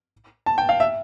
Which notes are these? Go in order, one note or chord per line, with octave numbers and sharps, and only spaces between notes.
A5
G5
F5
E5